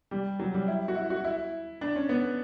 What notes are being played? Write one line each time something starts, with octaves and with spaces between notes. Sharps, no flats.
G3
F#3
G3
E4
F#4
E4
F#4
E4
D4
C#4
B3